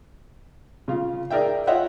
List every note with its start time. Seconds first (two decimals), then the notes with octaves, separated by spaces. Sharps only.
0.88 C#3 F4
1.30 G#4 A#4 D5 E5 G5
1.67 F4 C#5 D#5 E5 F#5 G5